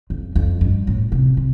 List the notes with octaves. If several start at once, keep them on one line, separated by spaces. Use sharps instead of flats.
F2
F2
G2
A2
C3
C3